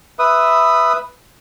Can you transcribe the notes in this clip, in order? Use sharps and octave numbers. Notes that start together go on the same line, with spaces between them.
B4 E5 D#6